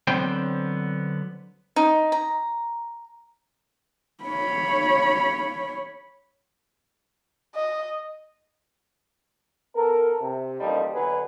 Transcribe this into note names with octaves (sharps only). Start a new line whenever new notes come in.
D3 F#3 B3 C4 C5 G5
D#4
A#5
C#5 B5
D#5
B3 A4 A#4
C3
A1 D#2 F3 G3 D#4
B2 D3 F#3 G#4 B4